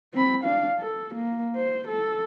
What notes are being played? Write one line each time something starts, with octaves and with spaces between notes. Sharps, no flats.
C4 B5
D4 F5
A4
A#3
C5
A4